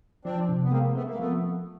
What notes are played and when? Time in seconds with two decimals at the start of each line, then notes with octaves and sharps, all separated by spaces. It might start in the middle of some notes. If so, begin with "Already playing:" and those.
0.25 F3 C4 D4
0.49 C3
0.64 B3
0.71 G#3 A#3 C4
0.95 A3 B3 C4
1.08 A#3
1.19 F3 A3 B3